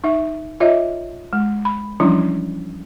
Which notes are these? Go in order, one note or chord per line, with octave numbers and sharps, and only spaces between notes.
D#4 E5
F4 C#5 D#5 E5
G#3
B5
E3 F3 G3 C#4 D4 E4